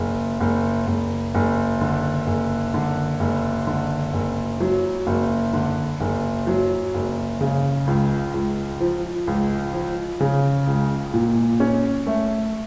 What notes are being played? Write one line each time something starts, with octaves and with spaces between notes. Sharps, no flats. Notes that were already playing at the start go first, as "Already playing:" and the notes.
Already playing: F#1
F#1
F#1
F#1
D3
F#1
D3
F#1
D3
F#1
F#3
F#1
D3
F#1
F#3
F#1
C#3
C#2
C#2
F3
C#2
F3
C#3
C#2
A#2
C#4
A3